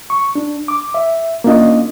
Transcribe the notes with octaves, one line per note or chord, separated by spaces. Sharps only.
C#6
D4
D6
E5
A#3 C#4 D4 F4 D#5